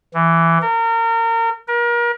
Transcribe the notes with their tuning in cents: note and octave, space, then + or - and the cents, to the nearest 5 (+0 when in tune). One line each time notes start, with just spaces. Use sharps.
E3 +10
A#4 -30
A#4 +35